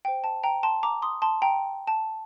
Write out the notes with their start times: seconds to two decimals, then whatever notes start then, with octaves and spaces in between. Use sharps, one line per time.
0.05 C5 G5
0.24 A5
0.44 G5 A#5
0.63 A5 C6
0.83 A#5 D6
1.02 C6 D#6
1.22 A5 C6
1.42 G5 A#5
1.87 A5